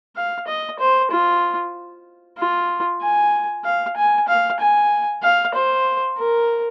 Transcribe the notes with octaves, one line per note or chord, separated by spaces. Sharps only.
F5
D#5
C5
F4
F4
G#5
F5
G#5
F5
G#5
F5
C5
A#4